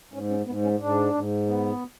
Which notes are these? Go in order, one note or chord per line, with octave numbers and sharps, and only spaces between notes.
G#2 C#4
C#4
G#2 B3
C#4
G#2 D4
G#2
B3